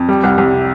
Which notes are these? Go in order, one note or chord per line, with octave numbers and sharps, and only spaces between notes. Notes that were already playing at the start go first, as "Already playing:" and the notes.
Already playing: F2
G3
C2
C2
C3